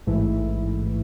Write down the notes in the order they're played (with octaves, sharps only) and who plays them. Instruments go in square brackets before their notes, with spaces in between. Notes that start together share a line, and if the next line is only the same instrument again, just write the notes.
[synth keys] A1 G#2 E3 A3 E4